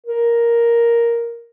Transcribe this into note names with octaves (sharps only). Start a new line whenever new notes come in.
A#4